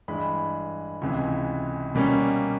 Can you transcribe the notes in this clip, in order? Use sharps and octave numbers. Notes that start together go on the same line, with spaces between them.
G2 E3 G#3 B5
C#2 C3 E3 G#3
B2 G3 A#3 C#4